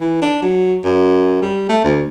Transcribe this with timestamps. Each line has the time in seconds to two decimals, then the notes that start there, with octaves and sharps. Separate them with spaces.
0.01 E3
0.22 D4
0.42 F#3
0.85 F#2
1.42 G3
1.69 A3
1.84 D2